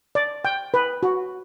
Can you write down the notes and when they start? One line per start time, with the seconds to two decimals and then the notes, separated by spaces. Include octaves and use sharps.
0.15 D5
0.45 G5
0.74 B4
1.03 F#4